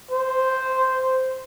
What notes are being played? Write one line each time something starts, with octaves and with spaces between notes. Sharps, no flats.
C5